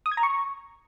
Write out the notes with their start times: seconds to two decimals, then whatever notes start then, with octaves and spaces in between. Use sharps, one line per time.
0.06 D#6
0.12 G#6
0.17 A#5
0.23 C#6